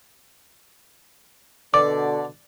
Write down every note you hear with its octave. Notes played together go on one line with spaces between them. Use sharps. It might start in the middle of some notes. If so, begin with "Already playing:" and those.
B2 D3 D5 D6